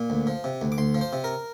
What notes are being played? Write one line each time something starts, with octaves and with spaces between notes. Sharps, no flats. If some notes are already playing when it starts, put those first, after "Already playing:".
Already playing: A#2
D2
F3
C3
D2
D6
D2 C6
F3
C5
C3
A#4